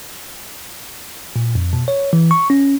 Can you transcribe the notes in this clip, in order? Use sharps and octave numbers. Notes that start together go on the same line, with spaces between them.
A#2
F2
B2
C#5
E3
C#6
C#4